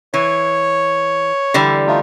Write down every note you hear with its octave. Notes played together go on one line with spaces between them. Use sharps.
E3 C#5
D3 E3 G3
A3 D#4 F4